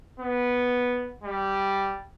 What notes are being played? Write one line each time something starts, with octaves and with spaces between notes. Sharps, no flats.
B3
G3